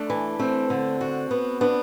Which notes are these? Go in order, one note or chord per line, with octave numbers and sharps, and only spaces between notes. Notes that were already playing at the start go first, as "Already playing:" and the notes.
Already playing: A3 D4
E3
A3 C4
D3
F#4
B3
B3 D4